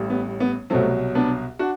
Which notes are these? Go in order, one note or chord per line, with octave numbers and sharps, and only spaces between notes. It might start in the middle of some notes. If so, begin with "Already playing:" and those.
Already playing: A1 A2 G3
B3
B3
C2 B2 F#3 A3 C4
B3 D4
D4 F#4